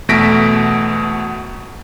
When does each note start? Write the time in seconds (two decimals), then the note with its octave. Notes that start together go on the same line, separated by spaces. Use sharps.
0.09 E2 B2 A3 A#6 B6 D7